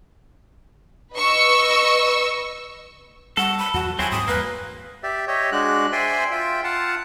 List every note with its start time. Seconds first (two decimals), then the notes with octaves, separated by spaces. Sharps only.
1.15 B4 D#5 C#6 E6
3.37 G3 A4 F#5
3.59 B5
3.74 E2 F#3 F#4
3.99 D#2 F#3 C4 E4 G#5
4.11 G#2 D#6
4.28 E2 G3 A#3 B4
5.03 G4 D5 E5
5.28 G4 C#5 D#5 E5
5.52 G#3 D4 F#4 F#6
5.92 C5 D5 E5 G5 G#5 C6
6.31 F4 E5 G5
6.64 F4 F5 F#5 A5